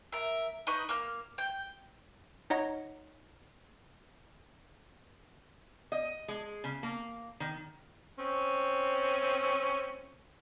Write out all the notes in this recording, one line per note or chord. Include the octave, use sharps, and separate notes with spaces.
A#4 E5
D#4 B4 D#5 C#6
A#3 F6
G5
D#4 C#5 D#5 F#5 A#5 A#6
D#5
G#3
C#3
A#3
D#3
C4 C#4